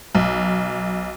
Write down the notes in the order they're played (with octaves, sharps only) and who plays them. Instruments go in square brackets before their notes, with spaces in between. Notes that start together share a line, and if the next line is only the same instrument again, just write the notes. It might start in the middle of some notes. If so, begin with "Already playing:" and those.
[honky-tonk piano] B1